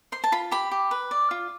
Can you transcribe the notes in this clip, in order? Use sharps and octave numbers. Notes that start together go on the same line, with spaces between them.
C5 C6
A5
F4 B5
G4 B5
G4
B4
D5
F4